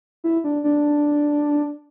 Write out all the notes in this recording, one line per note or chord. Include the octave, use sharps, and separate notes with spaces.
E4
D4
D4